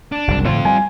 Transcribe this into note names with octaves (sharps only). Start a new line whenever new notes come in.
D4
F#1 C2
A2 D3 F3 C4 F4
G3 G#5